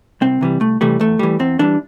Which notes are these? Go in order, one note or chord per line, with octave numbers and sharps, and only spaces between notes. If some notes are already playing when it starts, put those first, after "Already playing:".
C2 C4
C3 E3 G3
C2 A3
C3 E3 G3 A3
E2 A3
E3 G3
E2 C4
E3 G3 D4